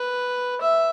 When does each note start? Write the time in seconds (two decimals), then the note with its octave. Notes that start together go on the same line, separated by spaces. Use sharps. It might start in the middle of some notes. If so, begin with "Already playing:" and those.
Already playing: B4
0.61 E5